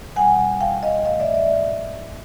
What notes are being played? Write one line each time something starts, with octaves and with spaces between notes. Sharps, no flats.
B2 G3 F#5 G#5
F5 G5
D#5 F5
G#2 E3 A3 D#5 F5
D5 E5
D5 E5